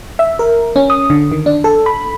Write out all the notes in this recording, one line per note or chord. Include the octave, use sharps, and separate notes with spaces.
E5
A#4
C#4
D#6
D3
D#3
D4
A4
B5